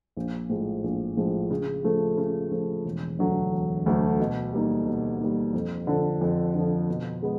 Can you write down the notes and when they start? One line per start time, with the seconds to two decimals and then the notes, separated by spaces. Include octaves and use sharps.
0.17 A#1
0.49 A2 F3 G#3
0.84 A#1
1.17 A2 F3 G#3
1.50 C#3
1.84 F3 A3
2.17 C#3
2.51 F3 A3
2.85 E1
3.19 D2 D3 F#3 A3
3.52 E1
3.86 D2 D3 F#3 A3
4.20 B2
4.53 G3 A#3 D#4
4.86 B2
5.20 G3 A#3 D#4
5.53 F2
5.87 D3 F3
6.21 F2
6.54 D3 F3
6.89 B2
7.23 G#3 B3